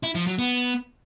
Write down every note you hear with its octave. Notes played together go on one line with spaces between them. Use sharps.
E4
F3
F#3
B3